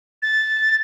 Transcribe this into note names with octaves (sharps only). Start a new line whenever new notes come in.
A6